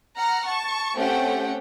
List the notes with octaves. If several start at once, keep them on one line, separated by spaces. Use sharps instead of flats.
F#5 A#5 F6
A5 C#6
A3 C4 C#4 G4 F#5 G5